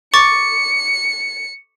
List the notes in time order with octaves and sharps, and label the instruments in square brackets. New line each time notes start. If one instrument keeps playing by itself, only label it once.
[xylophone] C#6 D6 A6 [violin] C#7